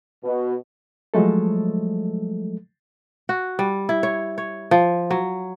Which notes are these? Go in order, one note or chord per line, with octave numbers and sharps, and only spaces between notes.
B2
F3 F#3 G#3 A3 A4
F#4
G3
E4
C#5
C#5
F3
F#3